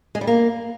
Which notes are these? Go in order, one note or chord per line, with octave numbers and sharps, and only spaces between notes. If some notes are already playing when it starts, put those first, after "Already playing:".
G#3
G3
A#3